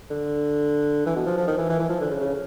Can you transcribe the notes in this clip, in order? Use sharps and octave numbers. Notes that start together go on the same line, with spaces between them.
D3
E3
B2
F3
F3
D#3
E3
E3
E3
F3
D3
C#3
C#3